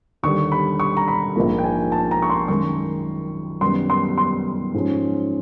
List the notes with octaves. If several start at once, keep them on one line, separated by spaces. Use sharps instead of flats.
D#2 D3 G3 C#6
B5
C#6
A#5
B5
A#1 G#2 F3 A#3
G5
G#5
A5
A#5
C#6
C6
F#2 D#3 G#3 C#6
F#2 D#3 G3 B3 C6
C6
C6
G#2 F3 G#3 C#4